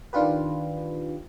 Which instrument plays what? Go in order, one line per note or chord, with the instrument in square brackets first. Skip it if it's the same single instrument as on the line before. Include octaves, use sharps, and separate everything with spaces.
[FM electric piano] D#3 D4 F4 G4 B4